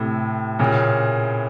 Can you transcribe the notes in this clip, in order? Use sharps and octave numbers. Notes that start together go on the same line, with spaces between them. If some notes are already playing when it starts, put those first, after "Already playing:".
Already playing: A2 C3
A#2 C#3